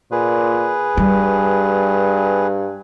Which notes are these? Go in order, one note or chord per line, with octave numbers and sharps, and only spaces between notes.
A#2 G#4 B4
G2 G3